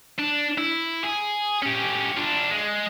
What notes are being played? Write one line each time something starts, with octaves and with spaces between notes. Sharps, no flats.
D4
E4
G#4
C#4 G4
D4 F4
G#3